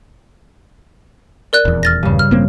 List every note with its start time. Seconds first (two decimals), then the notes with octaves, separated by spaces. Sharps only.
1.53 A#4 D5 F#6
1.65 D#1 E2
1.83 F6 A6 A#6
2.03 G2 C#3
2.19 F6
2.31 A1 A#3 C4